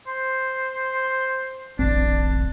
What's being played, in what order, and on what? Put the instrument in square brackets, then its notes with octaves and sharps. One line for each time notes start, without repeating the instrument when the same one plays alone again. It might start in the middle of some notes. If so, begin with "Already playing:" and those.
[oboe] C5
[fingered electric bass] D1 G2 C4 [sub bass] A1 [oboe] D4